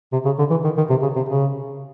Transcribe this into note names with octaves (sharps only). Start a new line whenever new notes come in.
C3
C#3
D3
E3
D#3
D#3
C3
C#3
C3
C#3